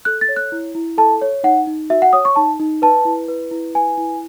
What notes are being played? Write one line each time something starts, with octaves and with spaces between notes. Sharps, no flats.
A4 F#6
A6
C#5
F#6
E4
E4
A4 A5
C#5
D#4 F#5
D#4
F#4 E5
F#5
C#5 D#6
C#6
D#4 A5
D#4
B4 A5
E4
B4
E4
B4 G#5
E4